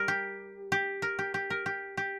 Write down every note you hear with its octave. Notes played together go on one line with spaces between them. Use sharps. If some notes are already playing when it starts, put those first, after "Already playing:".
Already playing: G3 A#4
G4
G4
A#4
G4
G4
A#4
G4
G4